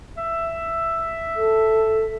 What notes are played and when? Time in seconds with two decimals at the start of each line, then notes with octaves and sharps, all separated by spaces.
0.17 E5
1.36 A4